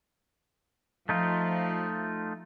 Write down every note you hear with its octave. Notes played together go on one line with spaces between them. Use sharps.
F3 A3 D#4 F4